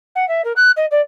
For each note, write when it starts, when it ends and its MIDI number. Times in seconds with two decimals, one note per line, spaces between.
0.15 0.27 78
0.28 0.42 76
0.45 0.53 70
0.56 0.71 90
0.77 0.86 75
0.91 1.01 74